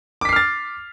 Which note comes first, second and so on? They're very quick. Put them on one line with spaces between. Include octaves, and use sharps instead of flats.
D6 B6 C7 F6 A6